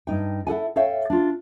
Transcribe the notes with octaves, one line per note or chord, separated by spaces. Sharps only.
G2 D#4 G5
E4 A4 F#5 G#5
A4 C#5 E5 F5 G5
D4 F4